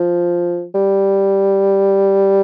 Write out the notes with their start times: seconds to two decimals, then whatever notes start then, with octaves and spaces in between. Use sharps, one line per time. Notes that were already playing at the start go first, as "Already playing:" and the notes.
Already playing: F3
0.75 G3